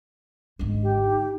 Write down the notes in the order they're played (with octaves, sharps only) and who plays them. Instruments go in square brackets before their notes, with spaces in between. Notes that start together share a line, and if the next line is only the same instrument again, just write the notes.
[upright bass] G#1 D3 [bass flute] G#3
[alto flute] G4
[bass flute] D#4